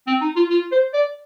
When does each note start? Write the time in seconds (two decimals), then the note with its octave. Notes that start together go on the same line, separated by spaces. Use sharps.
0.07 C4
0.21 D#4
0.36 F4
0.50 F4
0.72 C5
0.94 D5